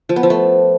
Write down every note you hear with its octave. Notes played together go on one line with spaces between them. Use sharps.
F3
B3
F3
A3